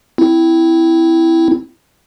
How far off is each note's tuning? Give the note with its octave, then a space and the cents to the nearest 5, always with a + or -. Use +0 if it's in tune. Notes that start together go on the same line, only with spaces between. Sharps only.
C4 -15 E4 +0